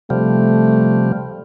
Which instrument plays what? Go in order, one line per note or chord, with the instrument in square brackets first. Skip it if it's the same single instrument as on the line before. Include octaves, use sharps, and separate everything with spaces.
[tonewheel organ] C3 F3 G3 [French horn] A3